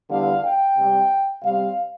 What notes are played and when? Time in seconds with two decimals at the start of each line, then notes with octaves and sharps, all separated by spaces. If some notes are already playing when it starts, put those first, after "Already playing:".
0.10 E2 D3 G3 B3 F5
0.44 G5
0.76 C3 G3 C4
1.43 C3 G3 C4 F5